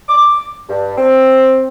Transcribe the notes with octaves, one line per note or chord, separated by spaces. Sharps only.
D6
G2
C4